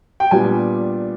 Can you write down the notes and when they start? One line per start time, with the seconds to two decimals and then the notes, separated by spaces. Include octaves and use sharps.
0.20 G5
0.31 A#2 G3 B3 D4 G#5